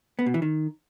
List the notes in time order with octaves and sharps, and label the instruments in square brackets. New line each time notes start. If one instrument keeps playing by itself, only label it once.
[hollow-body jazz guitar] B3
B2
E3
D#3